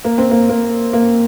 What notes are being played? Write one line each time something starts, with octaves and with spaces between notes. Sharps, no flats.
A#3
C4
A#3
A#3
A#3